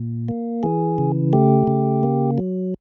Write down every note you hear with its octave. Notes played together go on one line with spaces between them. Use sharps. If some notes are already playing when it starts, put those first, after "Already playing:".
Already playing: A#2
A#3
E3 G#4
C#3
A3 G4
C#3
A#3
F#3